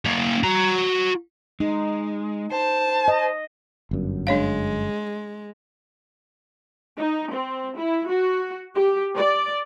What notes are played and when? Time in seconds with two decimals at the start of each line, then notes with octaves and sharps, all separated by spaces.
0.05 A#3 C#4
0.44 F#4 A#5
1.60 G#3 D#4
2.52 C5 A5
3.08 D#5
3.91 G1 F#2
4.27 G#3 D4 C#5 F5
6.98 D#4
7.32 C4
7.77 E4
8.08 F#4
8.75 G4
9.16 D5